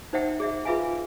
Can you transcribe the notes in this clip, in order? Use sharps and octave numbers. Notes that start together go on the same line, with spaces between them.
D#4 C5 D5 E5 F#5 G5
G#4 D5 E5
F4 G#4 B4 E5 F5 G#5